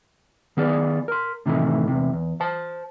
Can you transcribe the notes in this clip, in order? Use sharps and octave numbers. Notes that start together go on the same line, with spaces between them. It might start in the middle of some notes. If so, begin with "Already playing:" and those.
D#3 B3 G#4 D5
A#4 C6
A2 C3 D#3 E3 G3 A3
E2 C3
E2
C5 A5